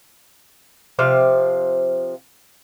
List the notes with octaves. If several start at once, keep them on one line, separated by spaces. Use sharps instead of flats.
C3 F3 F5